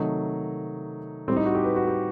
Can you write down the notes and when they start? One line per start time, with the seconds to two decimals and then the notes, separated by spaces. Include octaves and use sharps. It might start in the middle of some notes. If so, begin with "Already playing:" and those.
Already playing: C3 D#3 F#3 A3 D#4
1.28 A2 G3 C4
1.36 D#4
1.46 F#4
1.55 G4
1.64 B4
1.76 F#4
1.87 G4